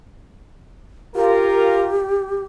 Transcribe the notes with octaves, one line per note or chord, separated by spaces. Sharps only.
F4 G4 A#4